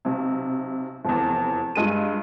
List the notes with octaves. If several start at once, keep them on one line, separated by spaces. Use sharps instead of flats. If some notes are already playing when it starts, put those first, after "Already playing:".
B1 C3
F1 E2
G2 G#3 F4 D#7